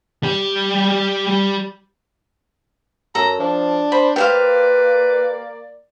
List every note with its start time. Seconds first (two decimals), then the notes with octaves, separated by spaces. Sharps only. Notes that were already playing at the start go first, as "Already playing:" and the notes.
0.23 G3 G4
3.15 F#2 A4 A#5
3.40 F3 D4
3.92 C5 B5
4.16 A#3 G4 B4 C5 D5 F5